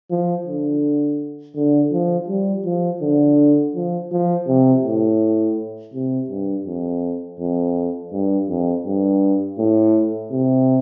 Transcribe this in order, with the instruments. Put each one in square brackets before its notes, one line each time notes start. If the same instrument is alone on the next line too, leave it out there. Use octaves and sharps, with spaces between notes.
[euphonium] F3
D3
D3
F3
G3
F3
D3
F3
F3
C3
A2
C3
G2
F2
F2
G2
F2
G2
A2
C3